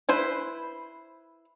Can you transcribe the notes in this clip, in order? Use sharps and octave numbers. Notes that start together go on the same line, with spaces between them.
E4 B4 C5